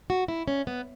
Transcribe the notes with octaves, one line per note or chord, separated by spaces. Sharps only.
F#4
E4
C#4
B3